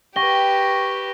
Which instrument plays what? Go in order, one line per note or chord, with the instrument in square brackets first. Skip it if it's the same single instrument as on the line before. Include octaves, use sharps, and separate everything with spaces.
[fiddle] G4 B4 [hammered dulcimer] G5 [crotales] C#6 A#6 G7